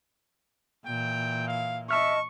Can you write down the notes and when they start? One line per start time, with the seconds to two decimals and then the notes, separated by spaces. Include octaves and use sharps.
0.86 A#2 E3 G5
1.47 F5
1.91 D#5 E5 A5 C#6 F6